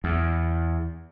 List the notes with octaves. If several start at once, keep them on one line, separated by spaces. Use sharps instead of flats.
E2